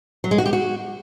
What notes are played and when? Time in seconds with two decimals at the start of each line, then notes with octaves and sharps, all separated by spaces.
0.24 F#3
0.31 G#3
0.38 F#4
0.46 G4
0.53 F#4